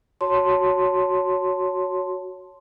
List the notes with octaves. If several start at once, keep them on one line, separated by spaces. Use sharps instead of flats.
F#4 C#5 A5 C6